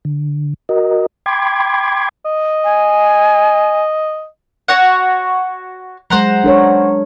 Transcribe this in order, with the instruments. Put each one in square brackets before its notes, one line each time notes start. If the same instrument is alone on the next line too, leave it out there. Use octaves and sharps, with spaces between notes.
[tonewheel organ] D3
F#4 A#4 D#5
G5 B5 C6 D6 G#6
[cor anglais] D#5
[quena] G#5
[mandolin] F#4 C#5 F#5
[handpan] F#3 G#3 [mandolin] C5 F#5 A#5
[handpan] D4 A#4 C#5